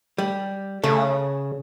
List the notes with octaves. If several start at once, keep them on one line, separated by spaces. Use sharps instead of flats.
G3
C#3 A3